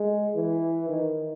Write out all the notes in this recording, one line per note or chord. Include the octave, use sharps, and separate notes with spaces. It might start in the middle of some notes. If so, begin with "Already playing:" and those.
Already playing: G#3
E3
D#3